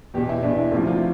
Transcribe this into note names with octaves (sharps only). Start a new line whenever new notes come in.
E2 B2 G4
E4
E2 B2 D4
E4
D2 C3 F3 E4
F4